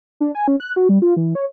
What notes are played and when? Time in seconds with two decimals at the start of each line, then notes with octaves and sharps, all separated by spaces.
0.20 D4
0.35 G#5
0.48 C#4
0.60 F#6
0.76 F#4
0.89 G3
1.02 F4
1.16 E3
1.35 C#5